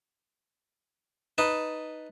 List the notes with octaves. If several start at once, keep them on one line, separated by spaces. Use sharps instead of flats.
D#4 B4 A5